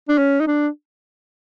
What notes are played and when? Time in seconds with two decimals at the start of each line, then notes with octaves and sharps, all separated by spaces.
0.09 D4
0.18 C#4
0.40 D#4
0.47 D4